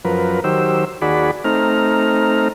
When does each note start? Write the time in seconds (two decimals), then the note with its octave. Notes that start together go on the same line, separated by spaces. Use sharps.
0.05 F#2 F3 A#4 B4
0.44 D#3 F#3 G4 C5 E6
1.02 D#2 F#4 G#4 D5 B5
1.44 A3 C4 D#4 A#5 F6